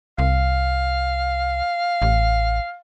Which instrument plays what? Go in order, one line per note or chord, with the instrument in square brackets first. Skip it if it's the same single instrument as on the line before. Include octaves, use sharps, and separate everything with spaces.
[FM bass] C2 [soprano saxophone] F5
[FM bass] A1